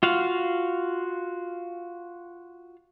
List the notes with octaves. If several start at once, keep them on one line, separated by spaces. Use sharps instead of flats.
F4 F#4 F5